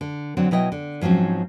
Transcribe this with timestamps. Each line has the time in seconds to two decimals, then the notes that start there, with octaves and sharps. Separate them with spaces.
0.01 D3
0.37 D3 F#3 C4
0.51 B2 F#3 E4 D#5 G5
0.72 D3
1.01 G#2 F3 F#3 C4 C#4